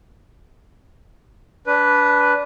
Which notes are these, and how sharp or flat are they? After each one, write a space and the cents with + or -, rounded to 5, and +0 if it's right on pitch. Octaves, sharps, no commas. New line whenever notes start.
D4 -20 B4 +0